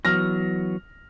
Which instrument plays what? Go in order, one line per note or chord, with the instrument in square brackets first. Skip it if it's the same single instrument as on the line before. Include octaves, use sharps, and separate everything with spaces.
[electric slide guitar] E3 F#3 B3 [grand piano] F6 A#6